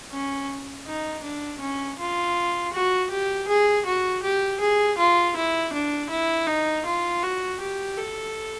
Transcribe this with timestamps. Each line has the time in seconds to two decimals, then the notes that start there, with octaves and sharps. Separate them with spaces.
0.12 C#4
0.86 D#4
1.23 D4
1.61 C#4
1.99 F4
2.73 F#4
3.10 G4
3.48 G#4
3.86 F#4
4.23 G4
4.60 G#4
4.98 F4
5.36 E4
5.73 D4
6.10 E4
6.47 D#4
6.86 F4
7.23 F#4
7.61 G4
7.98 A4